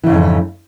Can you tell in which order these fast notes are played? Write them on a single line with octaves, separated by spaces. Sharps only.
E3 C#3 G#2 F2